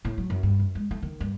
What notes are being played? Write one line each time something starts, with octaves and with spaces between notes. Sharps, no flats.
A2
F#3
F#2
G2
F#2
G#3
A3
D#3
G2